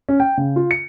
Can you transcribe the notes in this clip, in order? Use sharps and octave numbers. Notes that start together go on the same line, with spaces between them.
C#4
G5
C#3
F4
C#7